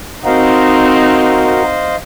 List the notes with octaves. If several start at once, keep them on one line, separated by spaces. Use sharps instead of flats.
C4 D#4 F#4 A#4 C5 D#5 F5